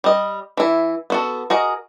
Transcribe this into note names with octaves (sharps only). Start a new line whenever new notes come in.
G3 D#5
E3 E4
B3 F#4 A4
F#4 G#4 A#4 D#5